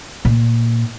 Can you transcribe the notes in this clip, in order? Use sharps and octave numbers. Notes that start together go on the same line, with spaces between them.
A#2